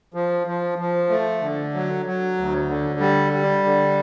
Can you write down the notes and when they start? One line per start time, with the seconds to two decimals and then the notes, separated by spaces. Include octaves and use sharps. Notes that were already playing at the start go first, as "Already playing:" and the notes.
0.14 F3
0.47 F3
0.78 F3
1.10 A3
1.41 D3
1.74 F#3
2.06 F#3
2.38 D2
2.69 D3
3.00 G3
3.33 G3
3.64 D3